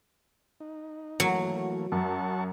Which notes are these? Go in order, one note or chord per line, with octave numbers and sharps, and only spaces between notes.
D#4
E3 F#3 A3 A#3
F#2 F#5 A5 C#6